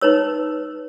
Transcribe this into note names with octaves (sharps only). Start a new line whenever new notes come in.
D#4 B4 C#5 E6